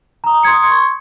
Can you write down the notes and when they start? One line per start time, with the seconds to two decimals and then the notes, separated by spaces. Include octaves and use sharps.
0.24 A#5 D#6
0.43 C6 D#6 G#6 C#7
0.71 C#6